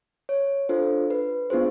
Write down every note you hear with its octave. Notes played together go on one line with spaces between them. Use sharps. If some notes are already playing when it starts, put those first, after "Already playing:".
C#5
D4 F4 A4 C5
B4
B3 D4 F4 G#4 C5